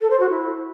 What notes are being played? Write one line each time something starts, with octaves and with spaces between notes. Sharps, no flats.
A4
C5
F#4
E4